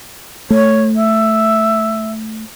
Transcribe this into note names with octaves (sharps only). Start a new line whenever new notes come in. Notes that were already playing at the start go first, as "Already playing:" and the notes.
A3 C#5
E5